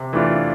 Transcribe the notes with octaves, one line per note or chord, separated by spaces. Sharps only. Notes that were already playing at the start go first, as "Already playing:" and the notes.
Already playing: C3
E3 A3 D4 F4